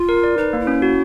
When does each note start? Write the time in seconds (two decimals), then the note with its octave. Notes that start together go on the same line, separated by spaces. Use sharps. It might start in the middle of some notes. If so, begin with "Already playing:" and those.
Already playing: F4
0.09 A#4
0.24 D5
0.37 D#4 B4
0.53 A#3
0.60 E4
0.67 C#4
0.82 F#4